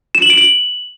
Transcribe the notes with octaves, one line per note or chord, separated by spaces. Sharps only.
E7
F#7
D7
F#7